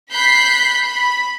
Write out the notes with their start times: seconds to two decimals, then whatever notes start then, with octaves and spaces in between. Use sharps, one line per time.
0.12 B5 F#6 G6 B6 C7
0.84 B5